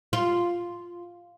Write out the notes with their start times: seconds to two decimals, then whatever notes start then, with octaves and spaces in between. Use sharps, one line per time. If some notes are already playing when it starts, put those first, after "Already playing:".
0.13 F4